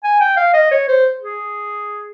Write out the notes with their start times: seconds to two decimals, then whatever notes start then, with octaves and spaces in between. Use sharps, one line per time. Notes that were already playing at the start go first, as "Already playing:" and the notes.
0.04 G#5
0.21 G5
0.37 F5
0.54 D#5
0.71 C#5
0.88 C5
1.21 G#4